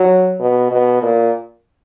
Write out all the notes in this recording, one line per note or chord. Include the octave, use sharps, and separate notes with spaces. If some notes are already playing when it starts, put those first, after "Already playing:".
Already playing: F#3
B2
B2
A#2